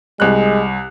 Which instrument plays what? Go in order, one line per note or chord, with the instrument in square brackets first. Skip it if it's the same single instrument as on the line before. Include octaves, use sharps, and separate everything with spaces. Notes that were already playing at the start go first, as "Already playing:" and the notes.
[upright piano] C2 F#6 [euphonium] G#3